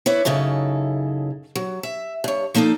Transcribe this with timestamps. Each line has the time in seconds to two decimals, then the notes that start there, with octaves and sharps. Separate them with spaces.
0.06 E4 B4 C#5 D5
0.25 F#2 C#3 D#4 E4 A4
1.56 F#3
1.83 E5
2.24 G2 C#5
2.54 F3 A#3 D#4 A4 D5